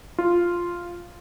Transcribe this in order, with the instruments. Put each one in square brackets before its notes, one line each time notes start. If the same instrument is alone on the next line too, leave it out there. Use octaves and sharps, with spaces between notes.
[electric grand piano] F4